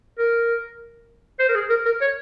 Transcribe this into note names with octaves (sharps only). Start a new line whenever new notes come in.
A#4
C5
A#4
G#4
A#4
A#4
C#5